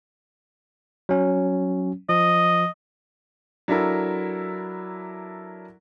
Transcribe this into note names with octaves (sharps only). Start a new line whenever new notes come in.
F#3 C#4
F3 D#5
F#3 D4 E4 A4 A#4